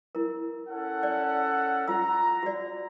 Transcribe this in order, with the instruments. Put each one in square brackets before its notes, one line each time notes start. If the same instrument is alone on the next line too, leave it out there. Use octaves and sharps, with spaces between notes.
[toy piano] E4 A#4
[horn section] C#4 A4 F#5
[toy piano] D5
[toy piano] F4 F#5 E6 [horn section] A#5
[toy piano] F#4 D5